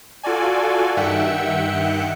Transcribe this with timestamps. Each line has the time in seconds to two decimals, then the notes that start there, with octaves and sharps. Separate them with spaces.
0.23 F4 F#4 A4 D5 G#5
0.97 G2 D#3 E5 F#5 G5 C#7